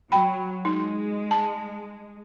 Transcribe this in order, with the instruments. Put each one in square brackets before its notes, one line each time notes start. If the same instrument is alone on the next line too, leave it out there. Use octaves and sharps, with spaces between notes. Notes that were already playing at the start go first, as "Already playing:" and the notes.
[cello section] F#3 [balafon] G5 B5
[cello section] G#3 [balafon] D#4
[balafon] A5